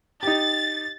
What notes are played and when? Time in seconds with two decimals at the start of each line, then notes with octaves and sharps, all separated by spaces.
0.23 D#4 G4 A6